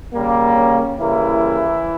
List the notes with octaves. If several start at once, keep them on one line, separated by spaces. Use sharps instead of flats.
C#3 G3 A#3
C#4
C#3 E3 G3 A#3 E4